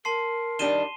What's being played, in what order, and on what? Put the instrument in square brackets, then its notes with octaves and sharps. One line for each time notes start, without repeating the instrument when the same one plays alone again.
[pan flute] A#4 [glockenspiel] A5 C6 C7
[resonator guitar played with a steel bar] D#3 G3 D4 [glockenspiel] D#7 E7 G7